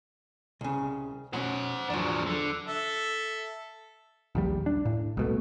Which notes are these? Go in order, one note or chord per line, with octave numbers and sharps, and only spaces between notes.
C2 C#3
B2 F#3 C#4 C5 F#5
E2 F3 F#3 D4
D3
A4 E5
A#1 D#2 G3
D4
A2
C2 B2 A3